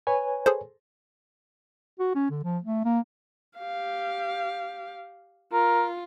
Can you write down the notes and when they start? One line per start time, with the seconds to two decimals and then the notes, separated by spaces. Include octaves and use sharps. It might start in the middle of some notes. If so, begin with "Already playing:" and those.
0.07 B4 C#5 G#5
0.46 G#4 A4 C5
1.99 F#4
2.15 C#4
2.30 D3
2.44 F3
2.63 A3
2.85 A#3
3.58 G4 F5
5.53 F4 A#4